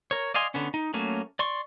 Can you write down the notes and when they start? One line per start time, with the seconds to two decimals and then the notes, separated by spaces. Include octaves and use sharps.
0.11 A#4 C#5
0.34 D5 D#5 F5 G#5 C6
0.54 D3 B3 C#4
0.74 D#4
0.94 F#3 A3 A#3 C#4
1.39 D5 C6 C#6